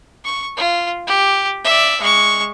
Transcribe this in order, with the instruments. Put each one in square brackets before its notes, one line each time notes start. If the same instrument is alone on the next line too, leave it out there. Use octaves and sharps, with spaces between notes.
[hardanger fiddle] C#6
F4
G4
D5 E5
G#3 C#6